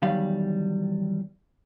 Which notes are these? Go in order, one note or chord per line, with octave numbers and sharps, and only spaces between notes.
E2 D#3 F#3 G3 F5 B5